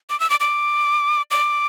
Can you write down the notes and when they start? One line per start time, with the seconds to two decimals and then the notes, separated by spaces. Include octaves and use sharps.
0.10 D6
0.20 E6
0.30 D6
0.40 D6
1.31 D6